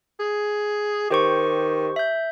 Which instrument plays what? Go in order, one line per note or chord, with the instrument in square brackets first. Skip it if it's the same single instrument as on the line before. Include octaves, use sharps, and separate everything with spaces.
[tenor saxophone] G#4
[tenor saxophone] D#3 [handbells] G4 C5 C#6
[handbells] E5 G6